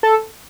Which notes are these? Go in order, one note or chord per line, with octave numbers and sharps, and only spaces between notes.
A4